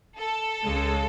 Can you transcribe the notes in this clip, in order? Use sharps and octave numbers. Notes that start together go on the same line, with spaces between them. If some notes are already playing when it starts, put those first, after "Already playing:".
A4
C#2 C#3 G#3